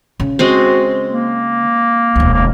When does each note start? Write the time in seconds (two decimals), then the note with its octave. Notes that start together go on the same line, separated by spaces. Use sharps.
0.20 C#3
0.39 G#3 C4 F#4
1.11 A#3
2.16 E1 D2
2.33 A#3